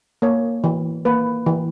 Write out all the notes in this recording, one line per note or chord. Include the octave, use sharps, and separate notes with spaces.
A#3 C#5
E3
A#3 B4
E3